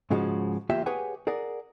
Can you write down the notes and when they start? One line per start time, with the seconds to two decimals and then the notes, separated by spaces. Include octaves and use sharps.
0.10 G#2 C#3 F3 G#3 F#4
0.69 E2 A#3 F4 G4 C#5 E5
0.86 G4 G#4 B4 C#5 F#5 G#5
1.27 G#4 A#4 D5 F#5